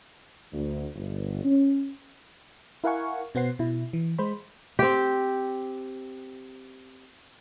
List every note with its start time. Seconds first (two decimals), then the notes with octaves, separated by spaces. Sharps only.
0.53 D2
0.95 G1
1.44 C#4
2.84 E4 A#4 F5 F#5 G#5 C#6
3.35 B2 B3 C5 F#5 C7
3.59 B2 E4
3.93 E3
4.18 G#3 C5 B5
4.79 C4 G4